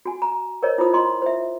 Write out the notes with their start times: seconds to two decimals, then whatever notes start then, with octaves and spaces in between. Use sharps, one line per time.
0.05 F#4 G#5
0.22 A#5
0.63 A#4 C5 C#5 D#5
0.78 E4 F4 C5 D#6
0.93 D#5 A#5 C6
1.22 C5 E5